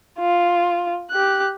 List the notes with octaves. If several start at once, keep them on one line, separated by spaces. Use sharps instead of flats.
F4
G4 F#6